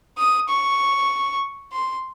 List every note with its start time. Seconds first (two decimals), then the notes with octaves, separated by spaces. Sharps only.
0.18 D#6
0.49 C#6
1.73 C6